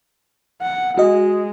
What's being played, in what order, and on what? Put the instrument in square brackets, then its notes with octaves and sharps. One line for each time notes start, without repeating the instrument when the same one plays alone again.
[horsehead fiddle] F#5
[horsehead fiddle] G#3 [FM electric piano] F#4 D#5